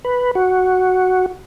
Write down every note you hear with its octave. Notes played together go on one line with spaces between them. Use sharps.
B4
F#4